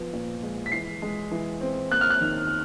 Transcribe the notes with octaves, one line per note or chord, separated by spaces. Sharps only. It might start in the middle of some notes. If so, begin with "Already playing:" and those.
Already playing: F3 B3
A#2
G#3
B6
E3 C7
G#3
E3
C4
A#3 F#6
F6
F#6
D#3